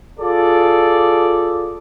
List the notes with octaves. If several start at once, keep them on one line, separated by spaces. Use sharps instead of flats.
F4 G#4 A4 D5